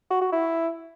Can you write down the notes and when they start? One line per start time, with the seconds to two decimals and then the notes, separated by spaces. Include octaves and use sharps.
0.10 F#4
0.21 F#4
0.32 E4